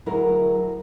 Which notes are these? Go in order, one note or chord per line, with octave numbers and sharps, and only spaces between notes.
D2 F#3 E4 G#4 A#4